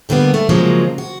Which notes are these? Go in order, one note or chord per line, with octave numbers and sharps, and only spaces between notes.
G2 D3 G3 A#3 B3
A3
C#3 F3 F#3 G#3 A#3
F#4